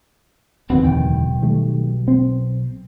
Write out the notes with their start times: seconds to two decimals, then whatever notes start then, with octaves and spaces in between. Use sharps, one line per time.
0.70 D1 E2 D#3 G3 B3 C4
0.82 B1 G5
1.42 D#3 G3 A3
2.08 C4